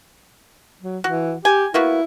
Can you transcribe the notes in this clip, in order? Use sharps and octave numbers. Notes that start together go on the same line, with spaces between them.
F#3
E3 F#4
G4 G#5
A#3 B3 E4 F#4